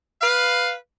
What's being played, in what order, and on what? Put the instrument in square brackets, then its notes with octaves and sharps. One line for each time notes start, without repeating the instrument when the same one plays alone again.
[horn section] B4 F5